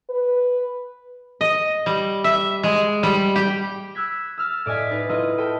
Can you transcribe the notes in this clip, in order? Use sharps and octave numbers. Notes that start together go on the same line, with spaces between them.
B4
D#5
G3
E5
G#3
G3
G4
E6 F#6 G#6 B6
E6 F6 A6
A2 D5 D#5 G#5 B6
D#4 B4 A6
E4 F4 B4 D#5 A#5
A4 G5 B5 D#7